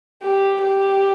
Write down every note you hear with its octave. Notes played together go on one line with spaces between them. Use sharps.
G4
G4